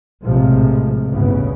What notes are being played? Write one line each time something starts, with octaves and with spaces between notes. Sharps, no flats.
A#1 A2 C3 F3 G#3
G1 D2 A2 C#3 B3